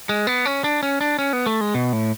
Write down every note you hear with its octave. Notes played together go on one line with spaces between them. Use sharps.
G#3
B3
C#4
D4
C#4
D4
C#4
B3
A3
G#3
B2
A2